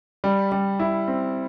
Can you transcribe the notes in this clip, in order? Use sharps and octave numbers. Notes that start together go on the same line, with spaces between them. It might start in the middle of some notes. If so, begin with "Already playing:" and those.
G3
G3
E4
C4